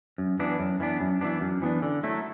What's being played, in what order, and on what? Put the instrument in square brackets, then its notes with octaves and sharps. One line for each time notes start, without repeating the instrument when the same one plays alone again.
[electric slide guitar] F#2
E3 B3 D4
F#2
E3 B3 D4
F#2
E3 B3 D4
F#2
E3 B3 D4
D3
F#3 A3 E4 A4